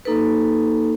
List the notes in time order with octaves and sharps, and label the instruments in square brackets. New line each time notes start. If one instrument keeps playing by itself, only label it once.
[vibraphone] A#3 D#4 A4 B4